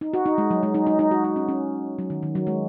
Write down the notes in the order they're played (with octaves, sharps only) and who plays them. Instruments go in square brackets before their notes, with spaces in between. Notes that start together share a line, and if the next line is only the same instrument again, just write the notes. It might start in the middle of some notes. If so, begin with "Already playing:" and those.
[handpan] D#4
F#4
D#4
G#3
F#3
G#3
D#4
D#4
D#4
F#4
D#4
C#4
C#4
F#3
D#3
D#3
F#3
G#3